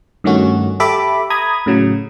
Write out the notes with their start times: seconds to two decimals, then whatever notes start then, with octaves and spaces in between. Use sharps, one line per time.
0.24 G2 D#3 A3 C#4 F#4
0.80 G4 A4 E5 B5 D6
1.30 A#5 B5 D#6 G#6
1.66 A2 C#3 F#3